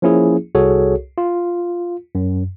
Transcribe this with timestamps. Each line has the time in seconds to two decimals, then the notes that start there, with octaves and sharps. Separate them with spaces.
0.02 F3 A#3 C#4 E4 G#4
0.55 C2 F#4 G#4 A4 C#5
1.18 F4
2.15 F#2